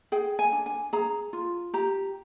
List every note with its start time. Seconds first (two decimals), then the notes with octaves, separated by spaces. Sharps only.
0.12 G#4 G5
0.39 G#5
0.52 D4
0.66 G#5
0.93 G#4 A#5
1.33 F4
1.74 G4 A#5